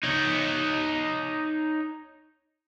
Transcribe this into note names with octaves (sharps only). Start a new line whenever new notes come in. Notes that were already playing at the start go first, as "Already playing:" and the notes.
D#4 C#5